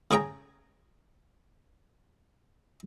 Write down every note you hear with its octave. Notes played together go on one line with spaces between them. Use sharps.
C#3 C#4 G#4 G5 A#5